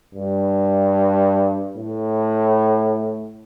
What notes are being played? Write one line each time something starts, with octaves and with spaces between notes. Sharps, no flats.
G2
A2